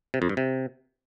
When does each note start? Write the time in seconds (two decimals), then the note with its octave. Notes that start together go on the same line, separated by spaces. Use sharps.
0.14 C3
0.22 F2
0.29 G2
0.37 C3